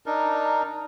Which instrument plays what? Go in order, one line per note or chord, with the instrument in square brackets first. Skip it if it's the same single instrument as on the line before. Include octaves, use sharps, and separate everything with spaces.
[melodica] D4 D#4 A#4